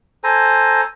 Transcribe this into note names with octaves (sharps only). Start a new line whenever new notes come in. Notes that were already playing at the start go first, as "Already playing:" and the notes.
A4 C5 G#5 A#5